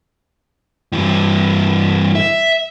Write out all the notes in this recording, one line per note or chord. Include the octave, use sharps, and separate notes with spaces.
G2 E3
E5